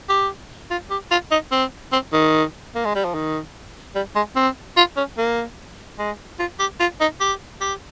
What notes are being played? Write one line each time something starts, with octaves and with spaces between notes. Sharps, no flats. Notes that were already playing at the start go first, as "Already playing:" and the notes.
G4
F4
G4
F4
D#4
C4
C4
D#3
A#3
G#3
G3
F3
D#3
G3
G#3
C4
F4
C#4
A#3
G#3
F4
G4
F4
D#4
G4
G4